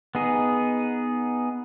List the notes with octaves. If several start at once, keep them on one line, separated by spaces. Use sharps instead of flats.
B3 D#4 G#4